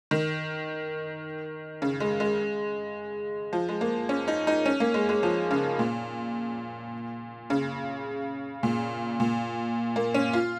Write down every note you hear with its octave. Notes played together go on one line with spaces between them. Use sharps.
D#3
C#3
G#3
G#3
F3
G#3
A#3
C#4
D#4
D#4
C#4
A#3
G#3
G#3
F3
C#3
A#2
C#3
A#2
A#2
A#3
C#4
F4